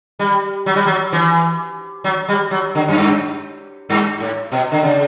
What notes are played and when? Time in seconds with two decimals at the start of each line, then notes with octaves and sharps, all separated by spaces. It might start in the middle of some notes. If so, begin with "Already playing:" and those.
0.19 G3
0.66 F#3
0.76 G3
0.86 F#3
1.13 E3
2.04 F#3
2.29 G3
2.51 F#3
2.75 D3
2.88 F#2
2.97 G2
3.89 G2
4.20 A2
4.52 B2
4.72 D3
4.83 C#3